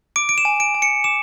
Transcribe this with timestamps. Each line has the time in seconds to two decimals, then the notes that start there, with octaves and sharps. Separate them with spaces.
0.16 D6 D7
0.29 D7
0.38 E7
0.45 G#5
0.60 D7
0.74 G#5
0.82 C#7
1.04 D6 E7